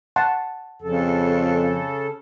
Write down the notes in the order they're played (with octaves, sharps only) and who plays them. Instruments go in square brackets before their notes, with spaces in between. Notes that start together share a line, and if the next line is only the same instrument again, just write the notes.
[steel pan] F#5 A5 C6
[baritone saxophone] F2 [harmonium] C#3 A4